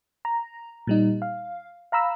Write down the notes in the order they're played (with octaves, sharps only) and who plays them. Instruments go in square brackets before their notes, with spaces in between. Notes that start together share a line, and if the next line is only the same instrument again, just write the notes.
[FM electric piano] A#5
A#2 G3 D#4
F5
F5 A#5 B5 E6